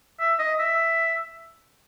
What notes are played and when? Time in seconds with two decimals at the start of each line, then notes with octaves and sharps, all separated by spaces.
0.20 E5
0.39 D#5
0.59 E5